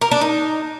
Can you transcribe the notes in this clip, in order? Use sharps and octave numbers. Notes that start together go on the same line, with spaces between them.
A#4
D4
D#4